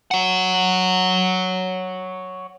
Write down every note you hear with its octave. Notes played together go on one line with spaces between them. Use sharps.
C#5 F#5